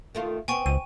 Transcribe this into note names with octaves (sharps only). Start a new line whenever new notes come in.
D#3 A3 F4
B3 C4 G5 G#5 C#6
C#2 D#7